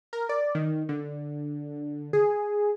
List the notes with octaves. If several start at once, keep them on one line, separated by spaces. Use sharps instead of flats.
A#4
D5
D#3
D3
G#4